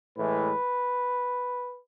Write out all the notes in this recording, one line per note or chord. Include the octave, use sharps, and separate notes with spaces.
A2 E3 G#3 B4